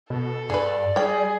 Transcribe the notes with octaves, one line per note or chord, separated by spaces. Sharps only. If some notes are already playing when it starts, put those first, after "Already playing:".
B2 A4
G2 G#4 B4 D5
G3 G#4 C#5 G5